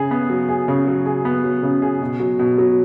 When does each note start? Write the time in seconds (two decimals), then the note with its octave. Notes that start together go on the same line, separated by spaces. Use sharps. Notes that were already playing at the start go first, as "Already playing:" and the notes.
Already playing: C#3 G#4
0.11 B3
0.30 F#3
0.49 G#4
0.68 C#3
0.87 F#3
1.06 G#4
1.25 B3
1.44 F#3
1.63 C#3
1.82 G#4
2.01 B2
2.20 F#3
2.39 B2
2.58 F#3